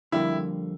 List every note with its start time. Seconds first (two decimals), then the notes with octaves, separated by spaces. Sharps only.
0.12 F2 D3 G3 A#3 E4